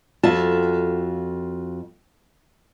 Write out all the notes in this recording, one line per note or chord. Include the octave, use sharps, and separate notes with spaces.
F2 F4 F#4 E5 A5